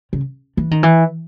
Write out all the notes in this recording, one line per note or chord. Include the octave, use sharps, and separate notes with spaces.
C#3
E3
D#3
E3